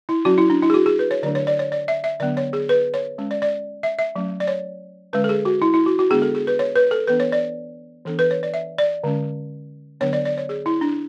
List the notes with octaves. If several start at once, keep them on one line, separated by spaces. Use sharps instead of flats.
E4
F#3 C#4 F#4
E4
D4
E4
G#4
F#4
G#4
B4
C#5
D3 F#3 A3 D4 D5
C#5
D5
C#5
D5
E5
E5
D3 F#3 B3 D4 D5
C#5
G#4
B4
C#5
G#3 C#4
D5
D5
E5
E5
F#3 A3 C#4
D5
C#5
D3 G#3 C#4 B4
A4
G#4
F#4
E4
E4
F#4
F#4
D3 G#3 B3 D4 G#4
A4
G#4
B4
C#5
B4
A4
E3 B3 D4 B4
C#5
D5
E3 B3 D4 A4
B4
C#5
D5
E5
D5
D3 G#3 C#4
D3 F#3 B3 D4 C#5
D5
D5
C#5
G#4
E4
D4